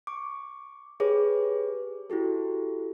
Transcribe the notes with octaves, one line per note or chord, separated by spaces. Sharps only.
C#6 D6
G4 G#4 B4 C#5 D6
E4 F#4 G4 A4